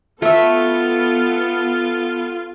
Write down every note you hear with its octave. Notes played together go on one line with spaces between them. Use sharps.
A3 B3 F4 A4 E5